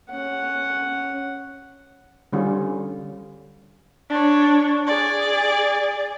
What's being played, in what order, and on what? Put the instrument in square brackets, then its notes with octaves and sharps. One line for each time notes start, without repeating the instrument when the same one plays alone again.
[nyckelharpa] C#4 F#5
[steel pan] D3 G3 C#4 F4
[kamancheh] D4 C#5
G#4 D5